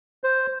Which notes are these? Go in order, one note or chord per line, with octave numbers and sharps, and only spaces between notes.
C5